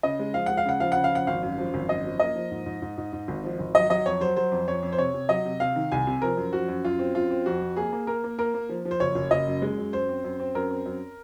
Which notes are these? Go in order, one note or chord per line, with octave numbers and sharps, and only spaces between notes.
C#3 D#5
G#3
F3 F5
G#3 F#5
F5
C#3 F#5
F3 F5
C#3 F#5
F5
F3 F#5
G#1 F5
F#2
F3
G#1
F#2 D#5
F3
A#3 D#5
F3
G#2
G#2
G#2
G#2
G#2
G#1
F3
G#1
F#3 D#5
F#3 D#5
F2 C#5
F#3 C5
F#3 C5
F2
F2 C#5
F2
C5
C3 C#5
C3
F#3 D#5
C3
C3 F5
D#3
C2 G#5
C3
F3 A#4
F#2
F3 F#4
F#2
F#2 F4
C4
F#2 F4
C4
F2 F#4
F2
A#3 G#4
A#3
A#3 A#4
A#3
A#3 A#4
A#3
F3
F3
C5
F#1 C#5
F#1
F#1 D#5
F#2
G#3
F#2
F#2 C5
C4
F#2
C4
F#2 A#4
C4
F#2